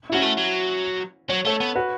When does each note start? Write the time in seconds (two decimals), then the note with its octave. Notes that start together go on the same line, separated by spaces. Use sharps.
0.10 E4
0.12 F#3 C#4 F#4
0.22 A3
0.37 F#3
1.29 F#3 C#5
1.45 A3 A4 C#5
1.60 B3
1.75 F#4 B4